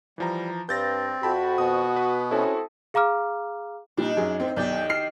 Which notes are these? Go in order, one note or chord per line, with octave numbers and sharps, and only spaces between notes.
E3 F3 G3 A#5
G2 C4 G6 A6 A#6
F2 F#4 G5 A5 B5
B2 D#6
B4
A3 C4 C#4 E4 F#4 A4
G#4 F5 A#5 D6 F6
A#2 G3 D4 D#4
F#2 G#4
A2 C4
B1 D#3 G4 D5 G6
F6 C7